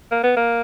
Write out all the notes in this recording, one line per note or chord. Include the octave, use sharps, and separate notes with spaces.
A#3
B3
A#3